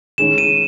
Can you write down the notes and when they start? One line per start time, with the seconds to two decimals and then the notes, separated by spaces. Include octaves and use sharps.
0.18 D#3 G#3 C#4 E4 G#4 E7
0.38 D#7